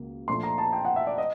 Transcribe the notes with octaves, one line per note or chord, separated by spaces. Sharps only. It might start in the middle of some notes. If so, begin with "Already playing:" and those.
Already playing: C#2 B2 A#3
A#2 F3 A3 D4 C6
A#5
A5
G5
F#5
E5
D5
D#5